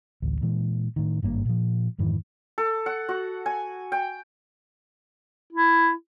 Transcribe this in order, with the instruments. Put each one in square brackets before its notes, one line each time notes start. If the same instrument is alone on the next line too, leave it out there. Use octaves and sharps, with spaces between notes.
[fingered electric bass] A1 D2
A#2 E3 G#3
A2 D#3
G#1 G2 D3 A#3
A#2 F3
F2 G#2 D#3 E3
[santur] A4
F#5
F#4
G#5
G5
[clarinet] E4